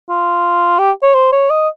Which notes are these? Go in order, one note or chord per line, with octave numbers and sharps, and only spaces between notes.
F4
G4
C#5
C5
C#5
D#5